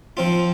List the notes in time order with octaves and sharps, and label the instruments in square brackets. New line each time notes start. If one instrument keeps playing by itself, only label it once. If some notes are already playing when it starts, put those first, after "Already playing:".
[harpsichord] F3 C4 F4